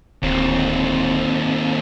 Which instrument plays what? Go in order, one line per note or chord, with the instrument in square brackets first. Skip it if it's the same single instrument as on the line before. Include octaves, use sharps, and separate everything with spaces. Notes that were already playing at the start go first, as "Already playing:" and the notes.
[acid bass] D1 [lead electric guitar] D#2 C4